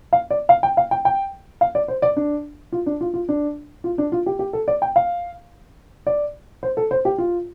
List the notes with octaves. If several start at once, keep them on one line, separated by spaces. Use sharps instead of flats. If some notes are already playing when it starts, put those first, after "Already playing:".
F5
D5
F5
G5
F5
G5
G5
F5
D5
C5
D5
D4
F4
D4
F4
F4
D4
F4
D4
F4
G4
G4
A4
D5
G5
F5
D5
C5
A4
C5
G4
F4